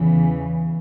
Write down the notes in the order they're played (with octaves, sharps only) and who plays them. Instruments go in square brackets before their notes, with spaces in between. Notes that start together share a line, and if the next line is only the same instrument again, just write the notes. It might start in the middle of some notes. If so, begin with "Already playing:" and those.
Already playing: [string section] E2 C#3 E3